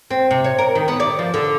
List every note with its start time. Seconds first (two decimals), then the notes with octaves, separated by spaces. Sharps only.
0.10 C4
0.31 C3
0.44 C#5
0.59 A#4
0.75 D#3
0.88 B3
1.00 D5
1.19 F3
1.34 D3